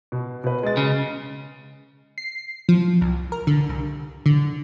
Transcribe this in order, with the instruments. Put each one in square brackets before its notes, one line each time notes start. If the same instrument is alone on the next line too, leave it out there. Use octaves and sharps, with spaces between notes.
[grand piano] B2
B2 B4
G#3 D#5 A6
[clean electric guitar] C#3
[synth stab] C7
F3
C2
A#4
D3
C2
D3